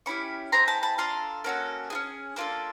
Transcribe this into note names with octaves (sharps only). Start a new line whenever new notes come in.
C#4 E4 G4 B5 C#6
C4 E4 G#4 A#5 C6
A5 B5
A5 B5
D4 F4 A4 A#5 C6
A#3 C#4 F#4 A4
C#4 F4 G#4
A#3 D4 F4 A4